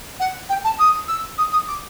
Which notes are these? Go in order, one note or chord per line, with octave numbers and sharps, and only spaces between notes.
F#5
G5
A5
D#6
E6
D#6
D#6
D6